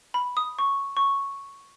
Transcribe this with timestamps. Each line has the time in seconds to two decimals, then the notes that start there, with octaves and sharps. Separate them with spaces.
0.14 B5
0.37 D#6
0.59 C#6
0.97 C#6